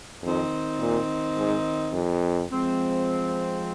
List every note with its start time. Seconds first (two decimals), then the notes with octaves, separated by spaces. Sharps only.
0.23 F2 D#3 C4 D#4
0.80 A#2
1.37 G#2
1.93 F2
2.50 F3 G#3 C4